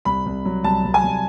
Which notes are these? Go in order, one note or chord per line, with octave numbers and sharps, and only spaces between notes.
C2 B5
C2
F#3
C2 A5
C2
G#5
C2